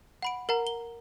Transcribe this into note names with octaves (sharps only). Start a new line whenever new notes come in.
F#5 B5 D7
A#4 F#5 A#5
G7